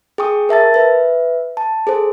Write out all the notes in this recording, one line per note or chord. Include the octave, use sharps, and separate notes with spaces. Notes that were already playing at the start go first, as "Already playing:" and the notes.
G#4 G5 C#6 D#6
A#4 E5 A5 A6
B4 E5
A5
G#4 A4 C5